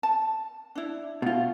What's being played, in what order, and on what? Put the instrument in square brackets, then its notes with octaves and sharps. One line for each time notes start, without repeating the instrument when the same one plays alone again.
[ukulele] A5
D4 E4
[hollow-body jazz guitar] B2 F4